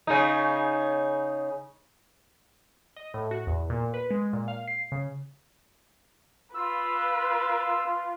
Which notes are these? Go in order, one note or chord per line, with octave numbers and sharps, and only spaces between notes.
C#3 D#4
D#5
A2
F#4
E2
A#2
B4
G#3
A#2
F5
C7
C#3
F4 B4 E6